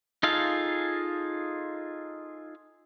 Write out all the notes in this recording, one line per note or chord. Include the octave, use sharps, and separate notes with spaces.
D#4 F4 G#4 A4 F5